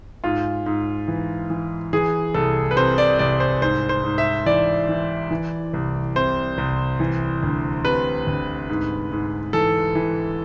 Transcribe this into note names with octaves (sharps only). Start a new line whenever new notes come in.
G#2 F4
G#2
E3
E3
E3 G#4
C2 A4
B4
C3 C5
D5
C2 D5
C5
G#2 C5
C5
G#2
E5
E3 D5
E3
E3
C2
C3 C5
C2
E3
D2
C3 B4
D2
G#2
G#2
E3 A4
E3